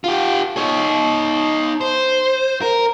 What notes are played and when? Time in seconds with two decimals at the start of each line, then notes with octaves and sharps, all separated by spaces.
0.04 F4 G4
0.57 D#4 C#5
1.81 C5
2.62 A#4